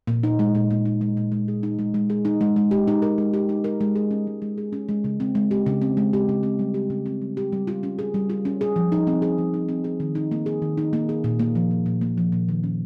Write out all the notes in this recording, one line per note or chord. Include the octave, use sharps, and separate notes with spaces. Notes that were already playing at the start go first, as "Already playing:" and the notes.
A#2
D#4
G#3
A#2
A#2
D#4
G#3
A#2
G#3
G#4
D#4
G#3
G#3
G#4
D#4
G#3
G#3
G4
D#4
A#4
G#3
G4
D#4
A#4
G#3
G#4
C#4
G#3
G#3
G#4
C#4
G#3
C#3
C4
G#3
G4
C#3
C4
G#3
G4
C#3
C4
G3
G4
C#3
C4
G3
G4
G3
F4
C#4
G#4
G3
F4
C#4
G#4
F3
D#4
C4
G#4
F3
D#4
C4
G#4
D#3
D#4
A#3
G#4
D#3
D#4
A#3
G#4
A#2
A#3
F3
A#2
A#2
A#3
F3
A#2
D#3
C#4